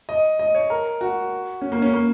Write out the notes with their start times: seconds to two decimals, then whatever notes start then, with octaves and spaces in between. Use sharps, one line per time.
0.09 D#5
0.39 D#5
0.55 C#5
0.70 A#4
1.01 F#4
1.62 C#4
1.72 A#3
1.82 C#4
1.93 A#3